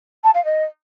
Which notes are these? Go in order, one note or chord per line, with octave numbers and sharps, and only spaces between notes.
A5
F5
D#5